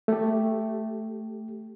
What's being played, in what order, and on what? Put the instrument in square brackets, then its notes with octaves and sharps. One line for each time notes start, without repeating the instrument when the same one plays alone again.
[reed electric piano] A3 G4